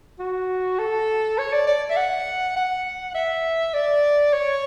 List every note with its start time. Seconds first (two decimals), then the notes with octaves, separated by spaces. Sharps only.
0.19 F#4
0.79 A4
1.38 C#5
1.53 D5
1.67 D5
1.90 E5
1.97 F#5
2.56 F#5
3.15 E5
3.74 D5
4.33 C#5